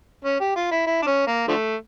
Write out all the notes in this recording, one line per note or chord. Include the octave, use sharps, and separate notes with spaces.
C#4
G4
F4
E4
E4
D4
C#4
A#3
D3 F3 A3